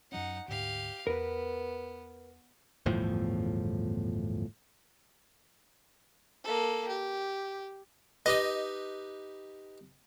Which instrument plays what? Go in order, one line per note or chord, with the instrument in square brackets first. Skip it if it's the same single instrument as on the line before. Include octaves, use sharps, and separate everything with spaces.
[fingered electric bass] F#2 F#3 C#4 [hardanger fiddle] D#4 F#5
[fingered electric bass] D2 G#2 [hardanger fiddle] G4 F5
[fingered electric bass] E2 [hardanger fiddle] B3 [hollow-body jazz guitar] A#4 B4
[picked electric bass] G1 E2 A2 F3
[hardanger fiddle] A#3 A4
G4
[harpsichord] D#4 G4 B4 [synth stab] D#5